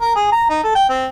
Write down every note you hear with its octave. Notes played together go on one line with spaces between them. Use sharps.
A#4
G#4
A#5
D#4
A4
G5
C4